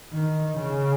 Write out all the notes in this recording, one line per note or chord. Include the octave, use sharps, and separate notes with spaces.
D#3
C#3